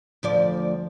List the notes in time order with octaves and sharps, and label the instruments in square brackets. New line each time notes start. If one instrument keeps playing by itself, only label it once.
[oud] D2 F3 D5